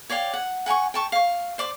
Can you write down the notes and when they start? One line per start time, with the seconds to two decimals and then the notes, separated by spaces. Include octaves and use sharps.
0.10 C#5 D5 F5 G5
0.34 F#5
0.66 F#5 G#5 A#5 C#6
0.94 G5 A5 C#6
1.12 F5 C#6
1.58 C5 D5 D6